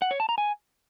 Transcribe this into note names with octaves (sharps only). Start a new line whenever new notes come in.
F#5
C#5
A5
A#5
G#5